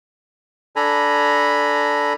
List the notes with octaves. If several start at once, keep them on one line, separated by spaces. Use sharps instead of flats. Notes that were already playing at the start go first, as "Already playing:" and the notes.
D4 A4 G#5 A#5 B5